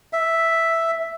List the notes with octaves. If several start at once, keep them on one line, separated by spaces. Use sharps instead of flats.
E5